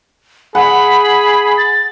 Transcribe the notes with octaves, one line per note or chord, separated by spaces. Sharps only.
G#4 F#5 B5
A6